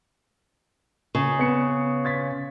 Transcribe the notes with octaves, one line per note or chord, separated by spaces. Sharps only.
C#3
B3 C#7
G#6 A6 B6